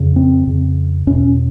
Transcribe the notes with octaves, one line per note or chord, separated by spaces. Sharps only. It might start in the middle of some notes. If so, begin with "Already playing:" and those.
Already playing: F2 C#3
C4
F2 C#3
E2 B2 C#4